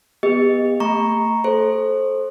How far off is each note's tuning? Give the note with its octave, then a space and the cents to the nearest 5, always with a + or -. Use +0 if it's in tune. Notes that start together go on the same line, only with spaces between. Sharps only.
B3 -5 G4 +35 D#5 +0
A3 +35 A#5 +0 C#6 +0
A4 -15 C5 +20